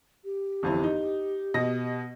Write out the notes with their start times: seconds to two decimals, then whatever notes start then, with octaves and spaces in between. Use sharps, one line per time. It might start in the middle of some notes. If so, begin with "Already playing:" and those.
0.25 G4
0.63 G1 F2 E3
0.83 D#4
1.54 B2 D#5 A#6